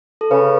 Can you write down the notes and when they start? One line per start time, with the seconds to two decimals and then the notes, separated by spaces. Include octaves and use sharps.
0.21 A4
0.30 C#3 B4